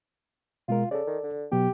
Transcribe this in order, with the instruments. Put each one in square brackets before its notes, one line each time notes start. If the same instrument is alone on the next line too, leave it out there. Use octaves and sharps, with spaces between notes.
[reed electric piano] B2 G#3 A#4 [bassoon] F4
[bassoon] C#3 [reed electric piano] A4 D5
[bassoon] D#3
D3
[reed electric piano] B2 F#3 B3 [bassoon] G4